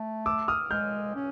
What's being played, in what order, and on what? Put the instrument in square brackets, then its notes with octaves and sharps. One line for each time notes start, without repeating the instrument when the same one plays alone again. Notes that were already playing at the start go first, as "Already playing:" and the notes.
Already playing: [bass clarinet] A3
[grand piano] D6 E6
D#6 F6
[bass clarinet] G#3 [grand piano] F6 G6
[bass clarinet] C#4